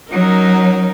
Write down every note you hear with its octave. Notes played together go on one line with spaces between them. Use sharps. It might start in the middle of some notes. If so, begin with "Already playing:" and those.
F#3 C#4 D#4 A#4